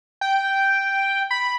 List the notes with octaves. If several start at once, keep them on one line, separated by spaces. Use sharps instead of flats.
G5
B5